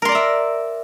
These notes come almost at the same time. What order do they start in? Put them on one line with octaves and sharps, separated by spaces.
A#4 C6 D5 A#5 E5